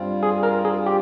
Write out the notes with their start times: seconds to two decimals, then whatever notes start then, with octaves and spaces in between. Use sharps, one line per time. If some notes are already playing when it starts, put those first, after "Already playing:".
Already playing: G2 G3 C4 F4
0.23 G#4
0.43 A#4
0.65 G#4
0.86 G4